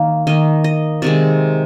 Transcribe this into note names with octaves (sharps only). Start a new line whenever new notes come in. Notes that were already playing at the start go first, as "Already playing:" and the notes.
Already playing: D#3 A#3 F5
D#3 A#3 D#5
D#5
C3 D#3 G#3 D5